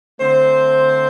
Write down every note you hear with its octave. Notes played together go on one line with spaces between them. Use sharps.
D3 A3 C4 C5